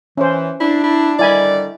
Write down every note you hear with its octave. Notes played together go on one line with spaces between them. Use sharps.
E3 C#4 C5
D4 E4
E4
D3 D#3 G3 E4 D5 G#5 B5